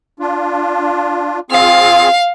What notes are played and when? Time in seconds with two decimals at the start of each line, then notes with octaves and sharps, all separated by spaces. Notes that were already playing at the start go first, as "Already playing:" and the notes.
0.20 D4 F4
1.51 C4 F4 G#4 F5